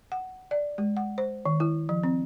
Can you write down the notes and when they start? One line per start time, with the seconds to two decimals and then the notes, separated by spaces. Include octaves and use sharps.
0.12 F#5
0.51 D5
0.78 G#3
0.97 F#5
1.18 C5
1.46 D#3
1.60 E4
1.89 F3
2.03 C4